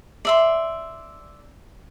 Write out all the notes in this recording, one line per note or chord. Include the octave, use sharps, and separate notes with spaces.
D5 E5 C6